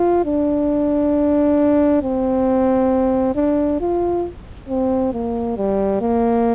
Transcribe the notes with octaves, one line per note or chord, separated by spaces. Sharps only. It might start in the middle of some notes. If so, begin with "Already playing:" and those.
Already playing: F4
D4
C4
D4
F4
C4
A#3
G3
A#3